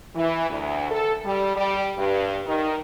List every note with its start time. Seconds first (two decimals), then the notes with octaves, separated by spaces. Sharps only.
0.15 E3
0.50 D2
0.91 A4
1.24 G3
1.56 G3
1.97 G2
2.46 D#3